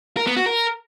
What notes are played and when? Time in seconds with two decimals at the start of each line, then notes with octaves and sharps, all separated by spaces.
0.17 A#4
0.27 B3
0.36 F#4
0.46 A#4